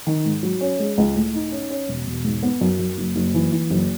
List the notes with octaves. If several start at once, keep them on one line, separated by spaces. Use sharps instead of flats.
D#3
G#2
F#3
C#4
G#3
C#2
A2
D#4
C#4
C#4
E1
E1
G#2
B3
F#2
F#2
F#1
F#1
E3
E3
F#1